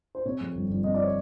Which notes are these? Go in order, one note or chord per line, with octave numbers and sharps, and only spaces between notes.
C5
C3 C#5
F2
G1
G1
C3 D#5
D5
C#5